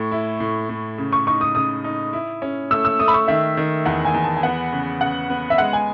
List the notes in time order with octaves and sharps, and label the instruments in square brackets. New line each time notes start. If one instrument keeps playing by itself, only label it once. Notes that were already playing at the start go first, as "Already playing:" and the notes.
Already playing: [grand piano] A2 [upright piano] C#6
[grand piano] E4
A2
A2
C#3
[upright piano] C#6
[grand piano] D#4 [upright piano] C#6
[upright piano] D#6
[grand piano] C#3 [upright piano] D#6
[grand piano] D#4
E4
C#4
[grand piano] A3 [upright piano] E6
[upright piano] E6
[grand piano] A3 [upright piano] D#6
[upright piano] B5
C#6
[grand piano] D#3 [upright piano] E5
[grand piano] D#3
[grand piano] E2 [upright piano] F#5
[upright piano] G#5
[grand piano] E2
[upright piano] A5
G#5
[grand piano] B3 [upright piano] F#5
[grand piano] C#3
[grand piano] C#3 [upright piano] F#5
[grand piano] B3
[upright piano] E5
[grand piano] G#3 [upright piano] F#5
[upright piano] G#5